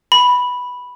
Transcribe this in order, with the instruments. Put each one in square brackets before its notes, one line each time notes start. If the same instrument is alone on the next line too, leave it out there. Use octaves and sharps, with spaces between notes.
[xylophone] B5